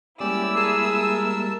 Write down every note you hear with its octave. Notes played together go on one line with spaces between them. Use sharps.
G3 G#3 A#3 C#4 E4 G4 D5 E6
G#4 A#4 A5